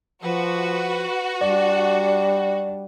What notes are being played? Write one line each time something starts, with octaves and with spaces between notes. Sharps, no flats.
F3 F#4 B4
G3 D4 D5